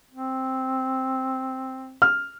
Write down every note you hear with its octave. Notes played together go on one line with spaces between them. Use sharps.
C4
F6